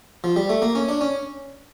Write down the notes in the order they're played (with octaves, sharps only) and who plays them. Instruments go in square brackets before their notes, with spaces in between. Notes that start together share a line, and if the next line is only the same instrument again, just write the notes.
[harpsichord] F3
G3
A3
A#3
C#4
D4
C#4